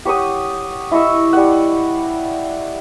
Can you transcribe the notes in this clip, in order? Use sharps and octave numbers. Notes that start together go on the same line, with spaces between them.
G4 C#5 F#5 D#6
E4 D#5 C#6 E6
G3 F#5